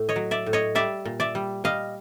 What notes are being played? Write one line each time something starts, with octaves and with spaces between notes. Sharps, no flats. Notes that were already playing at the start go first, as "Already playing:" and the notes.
Already playing: A2
C#5 D#5
F#3
D5 E5
A2
C#5 D#5
G3 D5 E5
A#2
D5 E5
G3
G3 D#5 F5